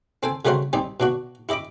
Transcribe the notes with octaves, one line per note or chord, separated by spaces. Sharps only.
C4 A4 G5 G#5
C#3 G3 A3 F#4 A#4 C5
G3 C4 D#4 G4
B2 D4 F#4
E4 G4 D#5 B5 D6